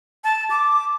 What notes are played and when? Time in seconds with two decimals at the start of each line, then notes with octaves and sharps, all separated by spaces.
0.24 A5
0.50 D6